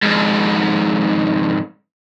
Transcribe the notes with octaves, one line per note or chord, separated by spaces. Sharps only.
F2 G#2